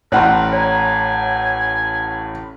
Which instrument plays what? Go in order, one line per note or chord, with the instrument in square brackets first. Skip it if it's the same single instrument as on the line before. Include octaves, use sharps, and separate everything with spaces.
[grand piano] A1 A2 [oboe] A#4 [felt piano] D5 F#5 C6 [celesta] A#5 F#6
[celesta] C#5 A#5 [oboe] G#5